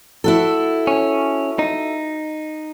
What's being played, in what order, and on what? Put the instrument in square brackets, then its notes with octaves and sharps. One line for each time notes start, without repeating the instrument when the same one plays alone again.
[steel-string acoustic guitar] E4 F#4 A4
[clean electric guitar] C#4
D#4